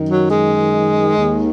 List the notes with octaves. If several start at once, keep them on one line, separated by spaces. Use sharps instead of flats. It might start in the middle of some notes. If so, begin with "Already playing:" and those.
Already playing: F#2 D#3
F#3
G#3
D#2 D#3